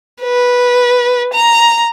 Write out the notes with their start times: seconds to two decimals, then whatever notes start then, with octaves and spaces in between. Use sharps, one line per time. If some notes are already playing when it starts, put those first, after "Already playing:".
0.22 B4
1.33 A#5